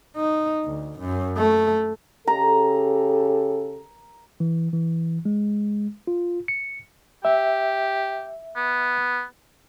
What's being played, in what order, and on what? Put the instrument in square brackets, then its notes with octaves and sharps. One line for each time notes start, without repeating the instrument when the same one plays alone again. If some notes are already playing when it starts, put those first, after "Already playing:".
[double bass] D#4
D2
F#2
A3
[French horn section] C#3 G4 A4 [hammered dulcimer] A#5
[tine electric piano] E3
E3
G#3
F4
C#7
[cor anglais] G4 [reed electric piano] E5
[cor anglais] B3